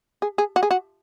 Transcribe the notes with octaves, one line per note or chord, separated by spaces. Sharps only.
G#4
G#4
F#4
G#4
F#4